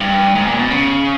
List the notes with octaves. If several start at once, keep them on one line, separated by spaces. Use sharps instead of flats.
G2
G#2
A#2
B2
C#3